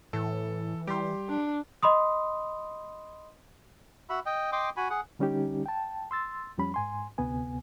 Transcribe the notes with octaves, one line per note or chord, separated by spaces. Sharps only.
A2 E3 A4
G3 G4 C6
D4
D#5 B5 C6 D#6
F#4 E5 B5
D#5 G5
D#5 G5 C6 D6
F#4 G#5 B5
G#4 F#5
D3 G3 C#4 D#4 G4
G5 A5
C6 E6 A6
F2 F3 G3 C#4 B5
G#2 G#5 C6
D2 C3 B3 G#5